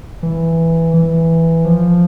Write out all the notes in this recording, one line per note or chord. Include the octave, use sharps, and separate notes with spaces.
E3
E3
F3